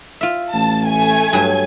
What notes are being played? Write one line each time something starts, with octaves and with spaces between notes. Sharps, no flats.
F4 E5
A1 A5
A3 G#5 G#6
G2 F#3